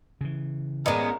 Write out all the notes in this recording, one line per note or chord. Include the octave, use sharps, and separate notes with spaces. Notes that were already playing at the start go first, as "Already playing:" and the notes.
C#3 E3
A1 G#3 B3 A#4 D5 D#5